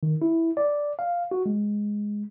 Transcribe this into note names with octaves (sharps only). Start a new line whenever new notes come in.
D#3
E4
D5
F5
F#4
G#3